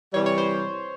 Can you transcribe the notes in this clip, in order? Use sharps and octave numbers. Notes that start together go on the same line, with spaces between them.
C3 E3 G3 C#5
C#5
C5